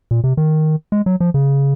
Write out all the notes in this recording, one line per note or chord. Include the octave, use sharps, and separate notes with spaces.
A#2
C3
D#3
G#3
F#3
F3
C#3